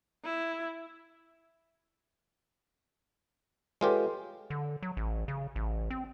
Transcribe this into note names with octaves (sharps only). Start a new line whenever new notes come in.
E4
G#3 F4 G4 A4 B4 C#5
D3
F#3
A1
C#3
A1
C4